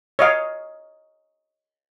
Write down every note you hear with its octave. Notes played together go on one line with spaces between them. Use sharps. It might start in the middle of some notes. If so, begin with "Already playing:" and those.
C#5 D#5 F5